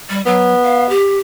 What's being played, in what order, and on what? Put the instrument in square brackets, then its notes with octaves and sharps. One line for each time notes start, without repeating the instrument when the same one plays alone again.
[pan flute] G3
[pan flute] F#3 [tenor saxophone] B3
[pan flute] F5
G4